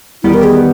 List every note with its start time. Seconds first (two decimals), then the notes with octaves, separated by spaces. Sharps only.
0.23 E2 D#3 G3 B3 E4 G4
0.34 A#4
0.44 G#4